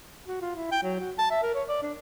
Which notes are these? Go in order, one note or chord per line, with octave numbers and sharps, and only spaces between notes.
F#4
F4
E4
G5
F#3
F#4
A5
E5
A#4
C#5
D5
D4